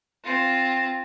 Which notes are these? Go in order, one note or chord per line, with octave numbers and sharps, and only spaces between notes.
C4 F4